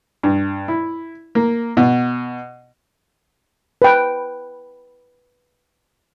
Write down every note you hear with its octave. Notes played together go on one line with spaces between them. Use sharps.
G2
E4
A#3
B2
B4 G5